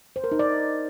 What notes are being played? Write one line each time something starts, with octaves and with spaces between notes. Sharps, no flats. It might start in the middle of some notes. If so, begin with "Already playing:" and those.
C5
A#4
D#4
D5